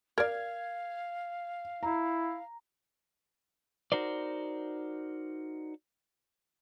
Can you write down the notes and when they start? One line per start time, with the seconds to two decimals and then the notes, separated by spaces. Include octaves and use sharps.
0.18 A#4 D5 F5 G#6
1.83 E4 A#5
3.92 D#4 F#4 A#4 C5 D5